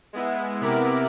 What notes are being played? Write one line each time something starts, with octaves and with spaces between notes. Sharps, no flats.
G#3 B3 E4
C3 B3 E4 A#4 B5 D6